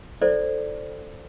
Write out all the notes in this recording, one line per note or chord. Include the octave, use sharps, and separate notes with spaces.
E4 A4 C5 D5